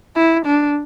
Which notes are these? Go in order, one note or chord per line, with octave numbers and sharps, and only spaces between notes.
E4
D4